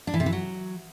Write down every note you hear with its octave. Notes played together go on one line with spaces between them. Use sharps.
D4
E3
C3
E3
F#3